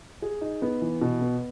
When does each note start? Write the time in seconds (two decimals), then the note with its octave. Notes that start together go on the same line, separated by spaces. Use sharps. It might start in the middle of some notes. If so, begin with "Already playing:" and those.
0.22 G#4
0.41 D#4
0.62 B3
0.81 E3
1.01 B2
1.21 B3